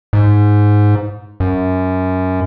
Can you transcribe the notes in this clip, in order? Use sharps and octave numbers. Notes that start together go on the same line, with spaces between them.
G#2
F#2